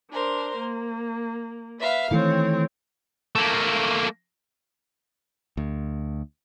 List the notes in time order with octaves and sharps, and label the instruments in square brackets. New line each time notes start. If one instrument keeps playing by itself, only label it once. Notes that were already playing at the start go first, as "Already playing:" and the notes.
[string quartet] D4 A#4 C5
A#3
B4 E5 F5
[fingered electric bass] D#3 E3 A3 [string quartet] C4 C#5
[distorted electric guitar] A3 A#3
[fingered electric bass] D2